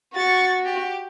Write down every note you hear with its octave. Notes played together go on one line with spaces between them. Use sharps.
F#4 C#6 A6
G4